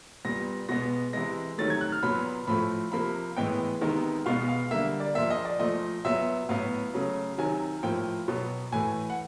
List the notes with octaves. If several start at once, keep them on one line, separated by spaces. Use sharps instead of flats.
A#2 G3 B3 A#6
B2 G#3 B3 A#6
C3 E3 G#3 A#6
C3 D#3 F#3 A3 A6
G#6
F#6
F6
A#2 F#3 B3 B5
A2 F3 A3 B5
C3 F3 A#3 B5
A2 E3 G#3 B3 G5
C3 D#3 G#3 B3
B2 G#3 B3 F5
F5
D3 G3 A#3 E5
D5
A#2 F3 A#3 E5
D#5
D5
A#2 F3 A3 D#5
A#2 F#3 B3 E5
A2 F#3 B3 F5
C#3 F#3 A3
C3 D#3 F#3 G#5
A2 F3 A#3 G5
B2 F#3 B3
A2 E3 A3 G#5
F#5